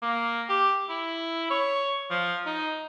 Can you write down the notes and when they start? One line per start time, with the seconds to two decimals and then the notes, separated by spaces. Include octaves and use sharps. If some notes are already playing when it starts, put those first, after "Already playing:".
0.02 A#3
0.49 G4
0.89 E4
1.50 C#5
2.10 F3
2.46 D#4